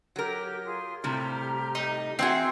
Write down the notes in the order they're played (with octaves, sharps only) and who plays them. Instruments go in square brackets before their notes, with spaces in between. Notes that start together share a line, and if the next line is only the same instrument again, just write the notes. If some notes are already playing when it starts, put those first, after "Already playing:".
[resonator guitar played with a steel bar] F#3 A#4 [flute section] G4
[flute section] F4 G#4 C6
[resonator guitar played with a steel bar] A2 C3 G3 [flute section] G4 A#5 F6
[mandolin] D#4
[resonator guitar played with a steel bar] E3 F#4 [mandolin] C4 E4 G#4